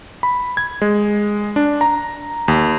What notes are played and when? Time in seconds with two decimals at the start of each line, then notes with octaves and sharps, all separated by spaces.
0.23 B5
0.57 G#6
0.82 G#3
1.56 D4
1.81 A#5
2.48 D#2